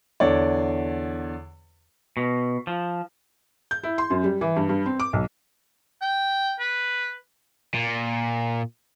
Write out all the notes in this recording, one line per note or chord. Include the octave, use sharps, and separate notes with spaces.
E2 D3 C#5 D5
B2
F3
G6
E4
C6
F#2
G3
E3
G2
G2
C4
D6
B1
G5
B4
A#2